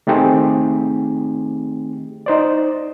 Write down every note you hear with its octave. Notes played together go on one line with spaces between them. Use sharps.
D#3 A3 C4 D#4 G4 G#4
D#4 C5 D5